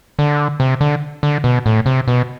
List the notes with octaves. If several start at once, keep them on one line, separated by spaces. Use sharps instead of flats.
D3
C3
D3
D3
B2
A2
C3
B2